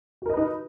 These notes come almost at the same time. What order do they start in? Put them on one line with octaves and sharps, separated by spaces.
F#4 A#4 D#5 B4 D#4